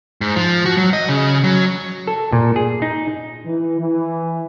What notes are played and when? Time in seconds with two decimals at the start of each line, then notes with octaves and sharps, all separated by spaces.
0.21 G#2
0.36 F3
0.65 F#4
0.77 F#3
0.93 D#5
1.09 C#3
1.44 F#3
2.07 A4
2.32 A#2
2.56 G#4
2.82 D#4
3.46 E3
3.80 E3